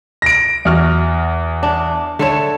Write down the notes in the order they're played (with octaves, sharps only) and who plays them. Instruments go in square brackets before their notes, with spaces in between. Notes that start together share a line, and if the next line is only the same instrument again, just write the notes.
[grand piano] A#6 D7
E2 F#4 F6
[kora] D4
[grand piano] D3 E7 [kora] A3 A4 C#5